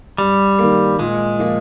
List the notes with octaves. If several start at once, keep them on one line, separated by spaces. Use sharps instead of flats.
G2 G3
D#3 A#3
A#2 G#3
F3 A#3 F4